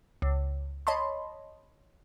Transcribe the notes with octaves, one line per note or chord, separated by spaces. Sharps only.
C#2
C#5 D#5 A5 B5 C6